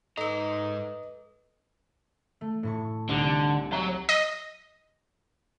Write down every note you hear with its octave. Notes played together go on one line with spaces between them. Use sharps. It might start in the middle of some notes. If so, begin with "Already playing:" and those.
G#2 D#4 A4 B4 D#5 A#5
A3
A2 E4 C#6
C2 D3 D#4 G#6
F#3 A#5
D#5